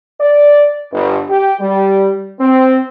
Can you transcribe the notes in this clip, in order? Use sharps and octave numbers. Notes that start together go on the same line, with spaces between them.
D5
G1
G4
G3
C4